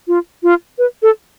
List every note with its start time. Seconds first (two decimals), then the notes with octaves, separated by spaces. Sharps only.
0.08 F4
0.43 F4
0.78 B4
1.02 A4